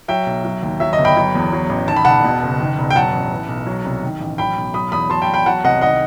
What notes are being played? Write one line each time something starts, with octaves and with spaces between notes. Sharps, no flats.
F#3 E5 G5
B1
F#3
D#2
F#3 E5
D#5
G1
G5 B5
F#3
E2
F#3
A1
D#3 A5
B5
E1 F#5 A5
B2
F#1
D#3
E1
G5
F#3 F#5 A5
A1
E3
B1
F#3
C2
D#3
A1
F#3 G5 B5
B1
F#3 B5 D#6
E2 B5 D#6
F#3 A5 C6
G5 B5
E2
G5 B5
F#3 F#5 A5
C2 D#5 F#5
D#3 D#5 F#5